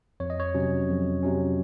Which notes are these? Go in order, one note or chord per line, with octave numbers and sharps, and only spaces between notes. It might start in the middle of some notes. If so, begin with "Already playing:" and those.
F2 C#5
D#5
C#5
C3 F#3 C#4
F2
C3 F#3 C#4